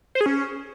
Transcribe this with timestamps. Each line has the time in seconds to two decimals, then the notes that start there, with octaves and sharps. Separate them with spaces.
0.15 C5
0.21 G#4
0.26 C#4